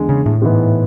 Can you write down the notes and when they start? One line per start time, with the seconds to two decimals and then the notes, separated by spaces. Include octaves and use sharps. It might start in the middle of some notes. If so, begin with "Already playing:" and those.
Already playing: E2 D3 G#3
0.09 C#3
0.26 A2
0.42 G#2 E3 B3